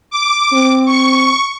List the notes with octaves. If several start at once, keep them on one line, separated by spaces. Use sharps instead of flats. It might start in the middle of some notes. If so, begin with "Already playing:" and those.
D6
C4
C#6